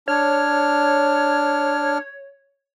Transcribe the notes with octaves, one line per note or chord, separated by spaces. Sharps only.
D4 C#5 F6